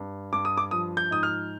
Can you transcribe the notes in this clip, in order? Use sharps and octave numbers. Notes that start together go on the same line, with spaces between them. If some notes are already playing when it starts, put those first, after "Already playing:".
Already playing: G2
G2 D6
D#6
D6
F3 D#6
G6
G#2 D#6
F6